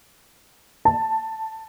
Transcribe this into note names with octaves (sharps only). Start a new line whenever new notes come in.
A5